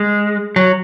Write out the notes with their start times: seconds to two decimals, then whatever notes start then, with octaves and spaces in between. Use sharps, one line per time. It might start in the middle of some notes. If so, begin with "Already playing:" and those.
Already playing: G#3
0.56 F#3